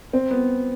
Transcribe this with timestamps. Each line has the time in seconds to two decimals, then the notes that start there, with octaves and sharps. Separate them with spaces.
0.13 C4
0.31 B3